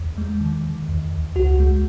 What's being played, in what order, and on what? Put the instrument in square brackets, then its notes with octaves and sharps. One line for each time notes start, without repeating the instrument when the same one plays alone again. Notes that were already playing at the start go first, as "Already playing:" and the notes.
Already playing: [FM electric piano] E2
G#3
D#3
D#3
E2
E2
C#2 F#4
G#3